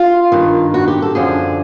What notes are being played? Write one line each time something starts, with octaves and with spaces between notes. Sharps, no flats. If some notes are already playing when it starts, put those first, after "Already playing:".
Already playing: F4
G2 D#3
F#4
G4
A4
F#2 D3 F3 G#4